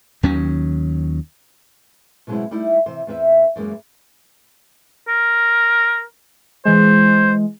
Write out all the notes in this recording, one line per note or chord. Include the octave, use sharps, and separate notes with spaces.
D#2 D#3 F#3 C#4
B2 F#3 G#3 B3 C4 E4
G3 A3 D#4 E4
C3 E3 C5
E2 C4 B4 E5
F#2 E3 G#3 A#3
A#4
E3 G#3 C5